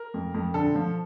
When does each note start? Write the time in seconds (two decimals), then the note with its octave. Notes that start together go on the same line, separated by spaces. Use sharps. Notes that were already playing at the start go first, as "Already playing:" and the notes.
Already playing: A#4
0.14 F2
0.34 F2
0.54 D3 A4
0.75 F3